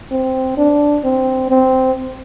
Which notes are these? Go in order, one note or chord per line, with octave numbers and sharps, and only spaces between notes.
C4
D4
C4
C4